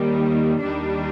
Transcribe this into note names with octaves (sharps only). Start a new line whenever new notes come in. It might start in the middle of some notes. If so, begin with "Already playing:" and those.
Already playing: D#2 D#3 G3
D#2 D#3 G3 D4